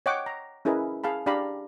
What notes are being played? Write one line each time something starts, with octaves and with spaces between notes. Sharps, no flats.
C#5 D#5 F#5 G5 D6
A#5
C#4 E4 G#4 A#4 B4 D#5
G#4 F5 A5 B5
D4 G4 D5 F5 A#5 B5